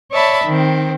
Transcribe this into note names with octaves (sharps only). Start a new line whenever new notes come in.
C#5 D5 E5 A5 B5
D#3 C4